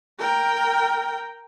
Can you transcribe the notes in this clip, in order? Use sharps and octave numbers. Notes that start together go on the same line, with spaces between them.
A#4 G5